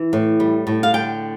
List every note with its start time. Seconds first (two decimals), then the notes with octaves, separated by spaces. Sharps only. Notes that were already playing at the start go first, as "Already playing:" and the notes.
Already playing: E3
0.13 A2
0.40 G3
0.67 A2
0.83 F5
0.94 D3 G5